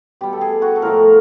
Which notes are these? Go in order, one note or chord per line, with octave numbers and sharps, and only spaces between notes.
B2 G3 G4
A4
G#4
F#4
A4
A2 F3 A3 A#4